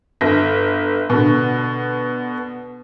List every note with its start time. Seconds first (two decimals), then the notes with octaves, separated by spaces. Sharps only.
0.21 G1
1.10 B2 D3